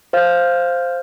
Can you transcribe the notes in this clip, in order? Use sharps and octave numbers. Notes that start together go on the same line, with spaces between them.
C5 F5 F6 G6